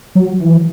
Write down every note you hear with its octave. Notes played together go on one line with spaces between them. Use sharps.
F#3
E3